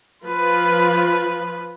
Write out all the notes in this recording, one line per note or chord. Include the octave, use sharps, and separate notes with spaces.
F3 F4 B4